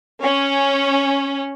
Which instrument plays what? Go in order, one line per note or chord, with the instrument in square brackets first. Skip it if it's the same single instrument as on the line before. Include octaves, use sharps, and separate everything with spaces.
[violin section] C#4